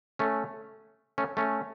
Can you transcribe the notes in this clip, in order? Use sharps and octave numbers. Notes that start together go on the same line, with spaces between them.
A3 C#4
A3 C#4
A3 C#4